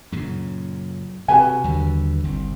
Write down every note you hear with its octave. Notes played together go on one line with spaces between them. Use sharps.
F#2 A#2 C#3
C3 F#4 B4 G#5
D#2 D3 G3
G1 C2